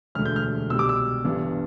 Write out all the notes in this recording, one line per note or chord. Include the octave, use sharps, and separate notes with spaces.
E1 D2 D3 A3 F6
G6
F6
C2 B2 G3 E6
D6
E6
G1 G2 E3 B3 D4